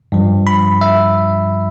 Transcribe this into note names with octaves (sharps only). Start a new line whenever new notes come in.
G2 F3
B5
E5